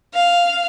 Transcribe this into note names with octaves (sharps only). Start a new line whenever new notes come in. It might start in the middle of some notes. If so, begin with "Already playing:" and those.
F5